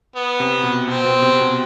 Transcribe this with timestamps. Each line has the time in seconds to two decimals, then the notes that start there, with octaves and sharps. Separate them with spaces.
0.16 B3
0.40 C3
0.63 B2
0.88 B2 C4
1.05 B2
1.22 C3
1.41 B2